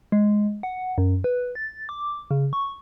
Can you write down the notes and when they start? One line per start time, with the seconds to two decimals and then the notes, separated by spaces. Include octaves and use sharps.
0.12 G#3
0.63 F#5
0.98 F#2
1.24 B4
1.55 A6
1.89 D6
2.31 C#3
2.53 C#6